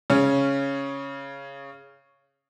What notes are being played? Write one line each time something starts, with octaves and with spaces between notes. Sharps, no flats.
C#3 C#4